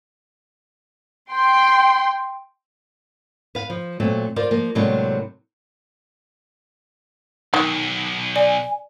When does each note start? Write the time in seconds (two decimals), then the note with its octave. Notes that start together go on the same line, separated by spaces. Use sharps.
1.32 G5 C6
3.55 B4 F5
3.70 F3
4.00 A#2 F#3 A3 C4
4.36 F4 A#4 C5 D5
4.51 F3 A#3
4.75 A2 C3 F#3 G#3 A#3 D4
7.54 B1 D#3
8.36 D5 G#5